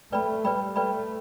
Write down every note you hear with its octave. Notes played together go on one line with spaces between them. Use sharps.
A3 B4 D5 G5 B5
G3 B4 D5 G5 B5
A3 B4 D5 G5 B5